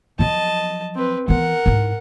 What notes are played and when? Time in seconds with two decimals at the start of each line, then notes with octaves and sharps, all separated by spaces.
0.19 F3 F#3 D#5 A5
0.95 C4 B4
1.28 E3 B3 A#4 F#5
1.66 G#2 E4